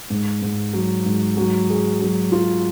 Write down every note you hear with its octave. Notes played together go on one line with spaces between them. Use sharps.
G#2
G#2
F#3
G#2
F#3
G#4
F#3
F4